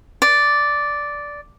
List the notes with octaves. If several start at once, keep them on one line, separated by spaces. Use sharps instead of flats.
D5